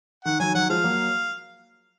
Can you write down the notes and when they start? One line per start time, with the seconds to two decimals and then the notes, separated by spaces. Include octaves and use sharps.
0.25 D#3 F#5
0.40 D#3 F#3 G#5
0.55 D#3 F#3 F#5
0.69 F3 G#3 F5
0.84 F#3 A#3